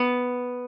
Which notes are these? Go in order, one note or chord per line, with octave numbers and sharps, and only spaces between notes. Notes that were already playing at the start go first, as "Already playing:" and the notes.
Already playing: B3